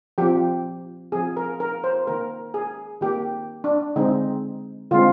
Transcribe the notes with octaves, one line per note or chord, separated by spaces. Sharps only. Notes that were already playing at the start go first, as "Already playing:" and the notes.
F3 C4 G4
F3 C4 G#4
A#4
A#4
C5
D#3 A#3 A#4
G#4
D#3 A#3 G4
D4
D3 G#3 C4 D#4
D3 G#3 C4 F4